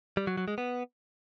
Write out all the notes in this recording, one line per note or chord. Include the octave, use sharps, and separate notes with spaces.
G3
F#3
F#3
G#3
B3